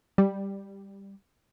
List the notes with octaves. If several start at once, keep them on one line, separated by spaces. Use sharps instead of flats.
G3